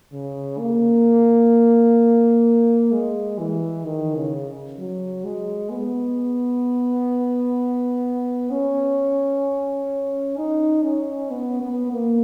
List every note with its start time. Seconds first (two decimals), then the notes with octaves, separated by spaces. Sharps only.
0.13 C#3
0.59 A#3
2.92 G#3
3.39 E3
3.85 D#3
4.16 C#3
4.79 F#3
5.25 G#3
5.71 B3
8.51 C#4
10.38 D#4
10.84 C#4
11.30 B3
11.62 B3
11.92 A#3